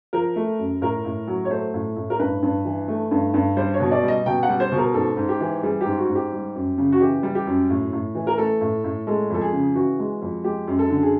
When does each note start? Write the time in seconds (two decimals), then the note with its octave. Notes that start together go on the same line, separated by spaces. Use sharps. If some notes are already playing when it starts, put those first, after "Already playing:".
0.13 F3 A#4
0.36 A3
0.59 F#2
0.82 A2 A#4
1.05 A2
1.27 F#3
1.45 C#5
1.50 A3 C5
1.74 A2
1.96 A2
2.10 A#4
2.19 G2 B4
2.43 G2
2.65 E3
2.88 A3
3.11 G2
3.34 G2
3.57 G3 C5
3.74 C#5
3.80 B2
3.91 D5
4.03 G3 D#5
4.26 B2 G5
4.43 F#5
4.49 G3
4.60 C5
4.72 B2
4.77 A#4
4.94 G#2 A4
5.17 G#2
5.29 G4
5.41 E3
5.63 G3 G#4
5.81 G#2 G4
5.98 F#4
6.09 G#2
6.15 G4
6.32 G3
6.55 F#2
6.78 C#3
6.92 F#4
7.01 E3 G4
7.23 G3
7.35 G4
7.47 F#2
7.69 A2
7.93 A2
8.15 E3
8.27 A#4
8.38 A3 A4
8.61 A2
8.84 A2
9.07 G#3 A4
9.30 F2 A4
9.41 G#4
9.53 C#3
9.75 E3 F#4
9.99 G#3
10.22 F2
10.44 G#3 G4
10.67 F#2
10.79 A4
10.90 D3
11.02 G#4